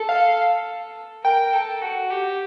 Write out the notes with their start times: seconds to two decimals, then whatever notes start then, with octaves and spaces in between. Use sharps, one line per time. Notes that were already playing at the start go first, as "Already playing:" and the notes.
Already playing: A4
0.09 F5
1.24 A#4 G5
1.53 A4
1.82 F#4
2.11 G4